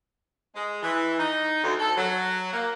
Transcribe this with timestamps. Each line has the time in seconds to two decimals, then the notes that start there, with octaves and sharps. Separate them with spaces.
0.55 G#3
0.83 E3
1.19 D#4
1.64 D2
1.79 A4
1.97 F#3
2.53 A#3